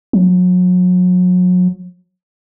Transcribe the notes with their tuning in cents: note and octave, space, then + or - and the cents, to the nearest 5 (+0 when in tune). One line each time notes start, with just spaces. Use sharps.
F#3 -35